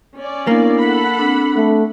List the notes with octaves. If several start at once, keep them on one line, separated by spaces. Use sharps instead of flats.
C#4 D5
A#3 B3 D4 E4
A4 F#5 B5
C4 D4
A3